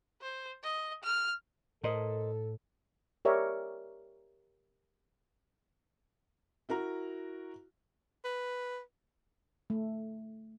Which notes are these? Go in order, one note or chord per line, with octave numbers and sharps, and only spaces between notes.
C5
D#5
F6
A2 A4 A#4 C5 D#5
G4 A#4 C#5 D5 E5
E4 F#4 A#4 A#5
B4
A3